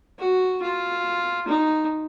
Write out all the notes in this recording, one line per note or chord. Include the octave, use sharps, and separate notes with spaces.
F#4
F4
D#4